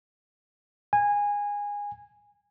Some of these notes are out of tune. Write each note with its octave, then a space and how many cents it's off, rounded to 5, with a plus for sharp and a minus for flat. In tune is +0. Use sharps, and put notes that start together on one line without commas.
G#5 -20